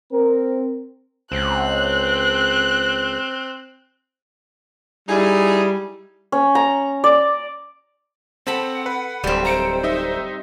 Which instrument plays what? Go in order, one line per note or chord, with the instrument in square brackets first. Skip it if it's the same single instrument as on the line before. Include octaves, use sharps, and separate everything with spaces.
[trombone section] C4 A#4
[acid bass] C#2 [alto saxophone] C4 [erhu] F#6
[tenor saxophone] G3 [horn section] D#4 E4 G#4
[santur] C#4
A#5
D5
[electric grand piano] C4 [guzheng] A4 A5 B5 [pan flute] F#5
[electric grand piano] B4
[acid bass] D1 [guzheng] G3 C4
[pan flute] C5 [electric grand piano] A#5 C#7 D7
[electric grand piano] D#4 D#5 E5